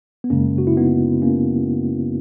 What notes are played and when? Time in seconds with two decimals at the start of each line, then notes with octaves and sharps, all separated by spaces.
0.24 B3
0.30 F#2 C#3 G#3 A#3 C#4
0.58 F#4
0.67 E4
0.77 B3 D#4
1.22 A#3 C#4